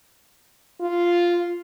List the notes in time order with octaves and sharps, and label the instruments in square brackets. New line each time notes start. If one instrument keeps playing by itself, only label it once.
[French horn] F4